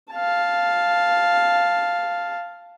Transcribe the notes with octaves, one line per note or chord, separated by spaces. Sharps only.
F5 A5